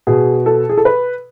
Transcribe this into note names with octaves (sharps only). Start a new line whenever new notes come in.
B2 G#4
A4
G#4
A4
B4